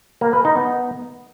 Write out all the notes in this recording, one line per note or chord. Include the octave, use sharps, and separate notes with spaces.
A#3
B4
D#4
B3